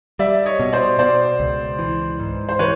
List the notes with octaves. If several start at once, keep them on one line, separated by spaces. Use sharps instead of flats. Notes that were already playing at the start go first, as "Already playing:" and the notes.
G3 D5 E5
C#5 D#5
B2
C5 D5
B2 C5 D5
C#2
E3
G#2
C5
E3 B4 C#5